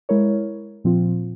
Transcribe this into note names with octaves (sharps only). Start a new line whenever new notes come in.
G#3 E4 A#4 C#5
A#2 F3 C4 F4